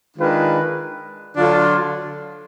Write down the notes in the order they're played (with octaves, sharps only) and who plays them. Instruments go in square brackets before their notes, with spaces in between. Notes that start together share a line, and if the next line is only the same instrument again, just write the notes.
[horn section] D#3 G#3 D4 F4 B4
D3 F#3 D4 F4